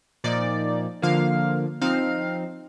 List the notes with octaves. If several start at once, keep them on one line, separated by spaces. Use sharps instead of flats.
A#2 F3 A#3 D#4 D5
D3 F3 A#3 F4 F5
F3 C4 D#4 F5